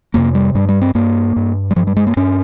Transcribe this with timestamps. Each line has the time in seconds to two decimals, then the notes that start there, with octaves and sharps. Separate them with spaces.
0.14 F2 C3 A#3
0.35 G3
0.55 G2 G3
0.69 G3
0.81 C4
0.95 G2 A#3
1.36 G2
1.71 G3
1.76 G2 F3
1.87 G3
1.96 G#3
2.07 A#3
2.17 G2 C#4